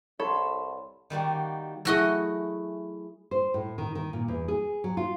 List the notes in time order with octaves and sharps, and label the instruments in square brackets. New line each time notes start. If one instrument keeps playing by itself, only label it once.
[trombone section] C2 [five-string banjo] A4 [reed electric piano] C#5 [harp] B5 C6
[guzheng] D#3 G3 A#3 F#4
[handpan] F#3 E4 G#4 [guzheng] A3 F#4 D#5
[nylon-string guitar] C5
A2
D#3
D#3
A#2
E2
G#4
F#3
F4